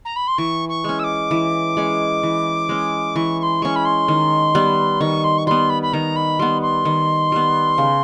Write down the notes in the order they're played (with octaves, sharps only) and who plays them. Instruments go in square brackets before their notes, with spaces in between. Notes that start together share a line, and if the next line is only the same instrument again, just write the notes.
[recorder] A#5
B5
C6
[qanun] E3 [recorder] C#6
[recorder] C#6
[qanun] G#3 C#4
[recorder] E6
D6
[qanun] E3
G#3 C#4
E3
G#3 C#4
[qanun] E3 [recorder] C#6
[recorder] C#6
C6
[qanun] G#3 C#4 [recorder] C#6
[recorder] B5
C6
[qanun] D#3
G3 B3
[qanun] D#3 [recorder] C#6
[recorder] C6
C#6
[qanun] G3 B3 [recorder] C6
[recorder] B5
B5
[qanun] D#3 [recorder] A#5
[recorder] B5
[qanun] G3 B3 [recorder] C6
[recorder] C6
[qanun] D#3
G3 B3
C#3